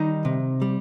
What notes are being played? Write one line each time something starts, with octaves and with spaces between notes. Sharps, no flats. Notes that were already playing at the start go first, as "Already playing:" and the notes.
Already playing: D#3 G3 D#4
C3
G3